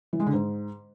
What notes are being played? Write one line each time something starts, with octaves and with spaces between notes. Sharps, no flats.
E3
G#3
D3
G#2